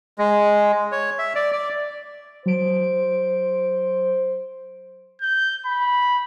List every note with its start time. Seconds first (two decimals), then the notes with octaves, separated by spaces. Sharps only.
0.18 G#3
0.92 C#5
1.19 E5
1.35 D5
1.52 D5
2.46 F#3 C5 D7
5.21 G6
5.66 B5